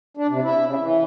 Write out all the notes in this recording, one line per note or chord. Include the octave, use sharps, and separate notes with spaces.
D4
C3
E4
C#3
E3